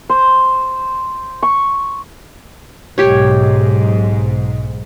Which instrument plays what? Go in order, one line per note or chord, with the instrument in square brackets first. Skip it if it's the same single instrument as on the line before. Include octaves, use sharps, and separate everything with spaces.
[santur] C5
C#6
[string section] B1 G#2 [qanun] G4 C#5